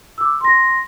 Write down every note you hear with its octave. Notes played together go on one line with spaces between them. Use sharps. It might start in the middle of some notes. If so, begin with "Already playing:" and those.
D6 E6
C6 A#6